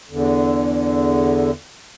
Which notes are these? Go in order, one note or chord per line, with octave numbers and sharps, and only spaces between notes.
E2 D3